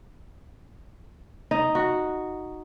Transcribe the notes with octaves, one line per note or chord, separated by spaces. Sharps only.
D#4
F#4